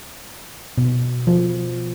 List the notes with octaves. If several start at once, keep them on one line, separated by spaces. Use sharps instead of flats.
B2
F3